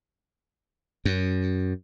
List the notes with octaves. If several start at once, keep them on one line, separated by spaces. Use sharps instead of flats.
F#2